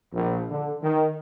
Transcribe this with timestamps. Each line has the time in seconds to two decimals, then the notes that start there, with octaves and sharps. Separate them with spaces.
0.13 A#1
0.49 D3
0.81 D#3